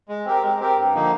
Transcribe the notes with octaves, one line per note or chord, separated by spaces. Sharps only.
G#3
C4 G4 A#4
G#3
C4 G4 A#4
G2
D3 F3 A#3 D#4